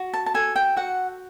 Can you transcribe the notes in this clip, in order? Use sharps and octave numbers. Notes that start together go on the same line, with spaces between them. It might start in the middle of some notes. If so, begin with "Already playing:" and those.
Already playing: F#4
A5
A5
A4 G#5
G5
F#4 F#5